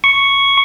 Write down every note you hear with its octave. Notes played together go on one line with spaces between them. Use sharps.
C#6